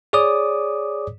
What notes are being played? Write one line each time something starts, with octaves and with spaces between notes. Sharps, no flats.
G#4 C#5 D5 D6 D#6